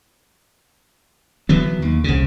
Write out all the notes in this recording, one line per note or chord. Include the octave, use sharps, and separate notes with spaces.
E3 F#3 B3
D#2
C2 C#3